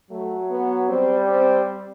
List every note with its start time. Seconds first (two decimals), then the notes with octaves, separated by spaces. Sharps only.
0.11 F#3 A3
0.50 B3
0.89 G3 C4
1.29 C4